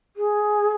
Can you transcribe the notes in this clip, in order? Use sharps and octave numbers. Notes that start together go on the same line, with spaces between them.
G#4